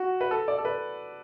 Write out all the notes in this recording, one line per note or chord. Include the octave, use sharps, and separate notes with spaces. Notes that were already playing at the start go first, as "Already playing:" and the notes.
Already playing: F#4
B4
A4
D5
A4
B4